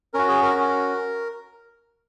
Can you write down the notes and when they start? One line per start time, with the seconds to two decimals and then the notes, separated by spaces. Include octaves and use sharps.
0.14 C#4 F#4 A#4
0.28 G#4
0.42 A#4
0.55 C#4
0.60 F#4